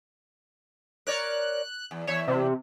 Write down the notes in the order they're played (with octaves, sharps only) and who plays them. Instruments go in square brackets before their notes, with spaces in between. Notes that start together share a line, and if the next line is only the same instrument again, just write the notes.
[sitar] A#4 C#5 D5 [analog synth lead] F#6
[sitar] E2
[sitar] E2 E5 [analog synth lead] C#5
[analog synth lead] C3